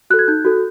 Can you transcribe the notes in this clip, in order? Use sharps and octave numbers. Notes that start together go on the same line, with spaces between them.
F#4 A4 F#6
G#6
D#4 G6
F#4 A4